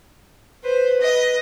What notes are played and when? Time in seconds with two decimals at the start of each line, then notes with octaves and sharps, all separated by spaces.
0.64 B4 C5
1.01 D#5